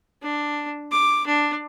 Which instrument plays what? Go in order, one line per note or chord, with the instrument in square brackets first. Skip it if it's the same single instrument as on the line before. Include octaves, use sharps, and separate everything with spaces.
[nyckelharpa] D4
D6
D4